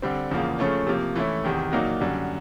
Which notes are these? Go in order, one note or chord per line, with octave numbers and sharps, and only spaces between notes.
D3 G3 C4
E2 C#3 F3 A#3
C#3 F3 A3 C#4
C3 F3 A#3
E3 A3 C#4 E4
E2 C3 D#3
A#2 F#3 A#3 D#4 F#4
F#2 D3 G3